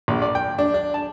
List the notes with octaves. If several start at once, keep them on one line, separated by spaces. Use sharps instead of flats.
A#1
D5
G5
D4
D4
A5